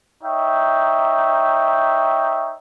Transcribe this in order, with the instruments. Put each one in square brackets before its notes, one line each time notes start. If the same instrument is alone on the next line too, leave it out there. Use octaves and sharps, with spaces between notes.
[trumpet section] D#4 C#5 E5 G5